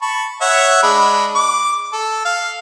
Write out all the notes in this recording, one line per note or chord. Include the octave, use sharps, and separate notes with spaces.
A5 B5 C#6
C#5 E5 F#5
G#3 D4 B5
D6
A4
F5